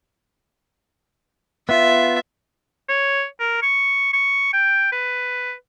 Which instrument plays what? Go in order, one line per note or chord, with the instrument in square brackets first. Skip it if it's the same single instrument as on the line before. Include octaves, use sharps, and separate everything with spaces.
[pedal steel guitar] B3 F4 [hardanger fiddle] E5
[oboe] C#5
A#4
C#6
C#6
G5
B4